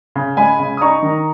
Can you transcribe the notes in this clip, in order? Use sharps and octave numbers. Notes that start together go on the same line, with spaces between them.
C#3
G#3 G#5 B5
C#3
D#6
D#4 A#5 C#6
D#3